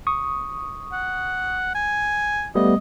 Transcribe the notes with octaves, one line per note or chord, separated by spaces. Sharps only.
C#6 D#6
F#5
G#5
G3 A3 B3 D#5